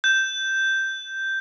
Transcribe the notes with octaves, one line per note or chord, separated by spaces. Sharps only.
G6